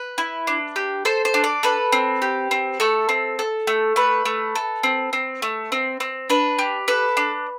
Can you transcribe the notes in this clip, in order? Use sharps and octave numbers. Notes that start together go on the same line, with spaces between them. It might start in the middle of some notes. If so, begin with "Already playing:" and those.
Already playing: B4
E4
D4
G4
A4 C5
C5
D4
D5
A4 B4
C4
G4
C4
A3 A4
C4
A4
A3
A3 B4
A3
A4
C4
C4
A3
C4
C4
D4 B4
G4
A4 B4
D4